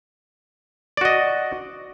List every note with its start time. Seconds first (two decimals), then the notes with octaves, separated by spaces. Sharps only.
0.97 D5
1.01 F#4
1.05 D#5